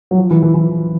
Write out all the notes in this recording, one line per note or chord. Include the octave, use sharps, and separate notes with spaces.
F#3
F3
E3
E3
E3